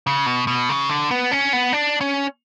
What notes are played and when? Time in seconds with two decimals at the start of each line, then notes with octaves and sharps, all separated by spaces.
0.07 C#3
0.26 B2
0.47 B2
0.69 C#3
0.89 D3
1.11 B3
1.32 C#4
1.53 B3
1.73 D4
2.01 C#4